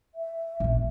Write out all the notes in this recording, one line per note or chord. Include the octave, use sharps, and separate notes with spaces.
E5
A#1 B2